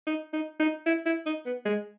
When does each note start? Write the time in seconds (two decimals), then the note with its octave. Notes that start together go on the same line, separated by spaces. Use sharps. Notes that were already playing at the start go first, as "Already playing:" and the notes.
0.07 D#4
0.33 D#4
0.60 D#4
0.86 E4
1.06 E4
1.26 D#4
1.46 B3
1.65 G#3